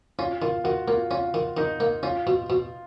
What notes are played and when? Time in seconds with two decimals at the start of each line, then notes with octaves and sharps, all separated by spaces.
0.19 C#4 F4
0.42 D#3 F4
0.64 D#3 F#4
0.88 A#3 F4
1.11 C#4 F4
1.34 D#3
1.57 D#3 D#4
1.80 A#3
2.03 C#4 F4
2.27 B2
2.50 B2